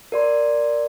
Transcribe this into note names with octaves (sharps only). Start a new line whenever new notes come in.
A#4 D5 C6